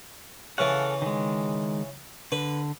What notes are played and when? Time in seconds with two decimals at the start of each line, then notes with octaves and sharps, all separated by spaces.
0.58 C#3 E3 A4 F5 F#5
1.02 D#3 G#3
2.32 D3 B4